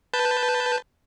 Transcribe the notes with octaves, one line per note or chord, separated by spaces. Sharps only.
B4 A5 G6